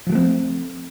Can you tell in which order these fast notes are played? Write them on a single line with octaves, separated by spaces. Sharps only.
F3 F#3 A3 C4